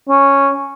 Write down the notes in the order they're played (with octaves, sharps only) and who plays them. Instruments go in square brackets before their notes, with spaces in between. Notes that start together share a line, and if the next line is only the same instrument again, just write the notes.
[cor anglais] C#4